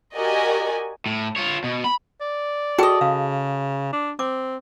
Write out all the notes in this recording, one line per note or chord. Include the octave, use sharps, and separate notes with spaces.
F#4 G4 A#4 D5 D#5 G#5
A2
F4 C#5
B2
B5
D5
F#4 G#4 A4 D#5 G5
C#3 F5
D4
C4 D6